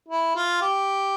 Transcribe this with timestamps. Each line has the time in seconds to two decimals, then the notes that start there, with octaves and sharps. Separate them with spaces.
0.09 E4
0.36 F4
0.62 G4